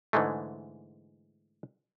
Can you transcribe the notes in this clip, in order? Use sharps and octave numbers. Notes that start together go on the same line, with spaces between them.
G#2 D3 E3 G#3 A3